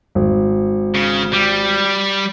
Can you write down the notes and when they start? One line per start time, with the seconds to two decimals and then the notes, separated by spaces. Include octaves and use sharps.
0.15 G#1
0.95 C#3
1.33 G3